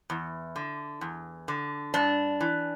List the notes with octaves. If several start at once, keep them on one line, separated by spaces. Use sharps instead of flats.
E2
D3
E2
D3
G2 D4
E3